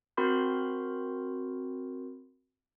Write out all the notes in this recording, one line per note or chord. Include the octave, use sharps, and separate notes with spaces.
C4 F#4 A#4 B5 C6 G6